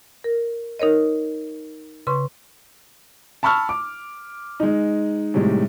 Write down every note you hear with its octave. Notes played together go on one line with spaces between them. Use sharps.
A#4
D#4 A#4 C#5 D#5
C#3 B4 C6 C#6
A5 B5 C#6 E6 F6
D6
G#3 D#4
A2 C3 D#3 G3 G#3